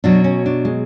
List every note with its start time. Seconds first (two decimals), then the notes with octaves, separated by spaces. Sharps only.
0.04 B2 F#3 D4
0.24 C#4
0.46 D4
0.65 G#3